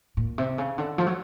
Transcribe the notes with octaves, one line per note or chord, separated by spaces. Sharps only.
A#2
C3
C#3
D3
F3
F#3